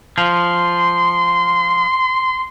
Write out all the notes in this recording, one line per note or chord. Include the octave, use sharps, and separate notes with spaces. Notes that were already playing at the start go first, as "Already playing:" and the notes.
F3 C6